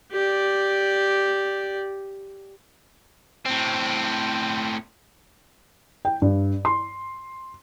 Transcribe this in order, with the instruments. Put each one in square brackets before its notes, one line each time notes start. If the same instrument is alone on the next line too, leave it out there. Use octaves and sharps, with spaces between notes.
[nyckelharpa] G4 D5
[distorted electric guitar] A2 C4
[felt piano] G5
G2
C6